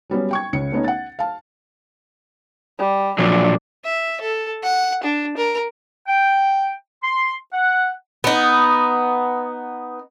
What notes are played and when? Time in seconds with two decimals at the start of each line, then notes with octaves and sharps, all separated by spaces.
0.10 F#3 G3 B3 C#4
0.31 G5 C#6 G#6
0.53 C#2 C#3 C#7
0.72 A3 B3 C#4 D#4
0.84 F#5 A6
1.19 F5 A5
2.79 G3
3.19 A#2 F3 F#3 D4
3.84 E5
4.21 A4
4.63 F#5
5.03 D4
5.37 A#4
6.08 G5
7.04 C6
7.53 F#5
8.24 B3 D#4